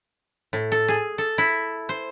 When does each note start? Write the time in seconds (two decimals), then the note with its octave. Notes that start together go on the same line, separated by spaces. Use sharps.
0.53 A2
0.72 A4
0.88 G#4
1.18 A4
1.38 E4
1.89 C5